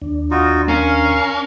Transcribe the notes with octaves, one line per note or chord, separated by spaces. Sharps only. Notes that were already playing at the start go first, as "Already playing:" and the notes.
D#2 D4
D#4 F4 F#4
C#4 A#4 F5